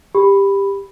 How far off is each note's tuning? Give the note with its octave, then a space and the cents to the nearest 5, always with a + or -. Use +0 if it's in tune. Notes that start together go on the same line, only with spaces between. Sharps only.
G4 +15 B5 +0